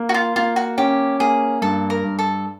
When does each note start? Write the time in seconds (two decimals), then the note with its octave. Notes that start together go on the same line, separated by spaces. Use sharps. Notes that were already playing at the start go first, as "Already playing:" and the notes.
Already playing: A#3
0.09 F#4
0.14 F4
0.36 A#3 F4
0.56 F#4
0.78 C#4 G4
1.20 A#3 G#4
1.61 G2 A4
1.90 A#4
2.04 G2
2.19 A4